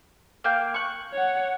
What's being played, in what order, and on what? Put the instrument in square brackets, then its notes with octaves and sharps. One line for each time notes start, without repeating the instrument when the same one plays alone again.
[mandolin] A#3 F5 G5
C#6 F#6
[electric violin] C#5 F#5